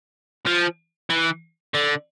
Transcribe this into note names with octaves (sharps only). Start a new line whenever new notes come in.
F3
E3
D3